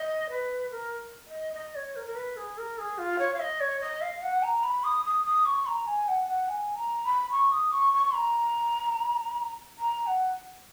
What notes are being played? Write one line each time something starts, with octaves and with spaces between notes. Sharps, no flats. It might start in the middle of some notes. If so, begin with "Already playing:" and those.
Already playing: D#5
B4
A#4
D#5
D#5
C#5
A#4
A#4
B4
G#4
A#4
G#4
F4
C#5
F5
D#5
C#5
D#5
F5
F#5
A#5
B5
D#6
D#6
D#6
C#6
A#5
G#5
F#5
F#5
G#5
A#5
B5
C#6
D#6
C#6
C#6
A#5
A#5
F#5